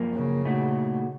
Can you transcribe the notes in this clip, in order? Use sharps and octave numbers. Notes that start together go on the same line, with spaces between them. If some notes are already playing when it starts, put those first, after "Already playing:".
Already playing: F#2 F3 A#3
C#3
A#2 A3 D#4 F#4